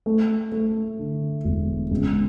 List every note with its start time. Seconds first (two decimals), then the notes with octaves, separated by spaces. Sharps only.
0.06 A3
0.52 A3
0.99 D3
1.44 E1
1.91 C#2